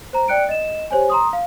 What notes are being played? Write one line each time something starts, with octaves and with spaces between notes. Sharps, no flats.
C5 A#5
D5 G5 F#6 C#7 D7
D#5 E7
G4 C5 C#5 G#5
A#5 C6 D#6
F5